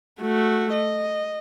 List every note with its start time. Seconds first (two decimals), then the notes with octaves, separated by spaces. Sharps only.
0.22 A3 F#4
0.73 D#5